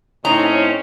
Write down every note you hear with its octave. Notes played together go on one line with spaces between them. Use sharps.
A2 C4 C#4 D#4 A#5